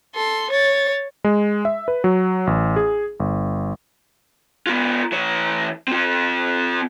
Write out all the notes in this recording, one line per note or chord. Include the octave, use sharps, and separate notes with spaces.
A4 C6
C#5 A6
G#3
E5
B4
F#3
A1
G#4
G1
B3 F4
E3 C#5
C4 F4